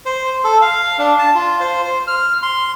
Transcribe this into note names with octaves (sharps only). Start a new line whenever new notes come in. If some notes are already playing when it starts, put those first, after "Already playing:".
C5
A4
F5
D4
A5
F4
C5
C5
F6
C6